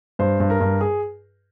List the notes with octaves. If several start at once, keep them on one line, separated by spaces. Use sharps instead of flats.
G2 C5
G2
A#4
G2
G#4